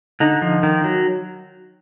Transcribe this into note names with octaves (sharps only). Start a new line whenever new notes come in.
D3 D#4
F3
D#3
F#3